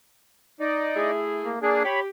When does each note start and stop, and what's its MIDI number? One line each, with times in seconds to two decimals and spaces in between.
0.60 1.11 63
0.60 1.11 74
0.96 1.56 57
0.96 1.56 64
0.96 1.56 68
1.45 1.59 58
1.62 1.83 58
1.62 1.83 62
1.62 1.83 68
1.84 2.08 67
1.84 2.00 73
1.84 2.00 83